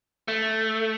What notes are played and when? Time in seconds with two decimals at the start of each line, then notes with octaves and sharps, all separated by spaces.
0.28 A3